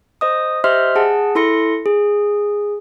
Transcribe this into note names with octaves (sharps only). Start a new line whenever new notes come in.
C5 D#5 D#6
G4 C5 D#5 E5 C6 F6
G#4 F#5 A5
E4 A4 C6 A#6 C#7
G#4